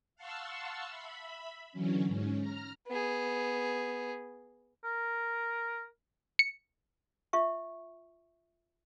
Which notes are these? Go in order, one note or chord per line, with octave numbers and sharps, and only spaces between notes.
F5 F#5 A5 C6 C#6 E6
E5 B5
D3 E3 F#3 C#4
G#2 C#4
A#5 F6
B3 G#4
A#4
C#7
F4 E5 C#6